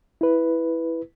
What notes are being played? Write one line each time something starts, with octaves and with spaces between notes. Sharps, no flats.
E4 B4